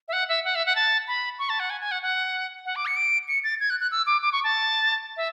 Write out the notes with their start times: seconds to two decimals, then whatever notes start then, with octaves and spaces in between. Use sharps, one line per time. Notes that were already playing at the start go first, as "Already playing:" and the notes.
0.08 E5
0.13 F#5
0.29 E5
0.45 F#5
0.55 E5
0.66 F#5
0.75 A5
1.07 B5
1.39 C#6
1.49 A5
1.60 F#5
1.70 G#5
1.81 G#5
1.91 F#5
2.02 F#5
2.66 F#5
2.76 D6
2.86 C#7
2.96 D7
3.28 C#7
3.44 A6
3.60 G#6
3.70 F#6
3.80 F#6
3.91 E6
4.07 D6
4.22 D6
4.32 C#6
4.44 A5
5.17 E5